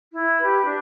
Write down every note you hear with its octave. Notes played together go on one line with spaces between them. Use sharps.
E4
G4 B4
D4